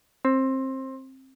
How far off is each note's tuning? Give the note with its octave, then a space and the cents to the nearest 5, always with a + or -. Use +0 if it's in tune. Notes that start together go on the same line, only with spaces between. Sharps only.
C4 +20